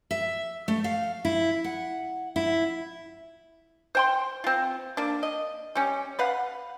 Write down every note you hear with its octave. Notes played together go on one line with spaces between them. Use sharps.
E5
A3
F5
E4
F#5
E4
C5 G5 C6
C4 F4
A#3 D4
D#5
G3 C#4
B4 F5 F#5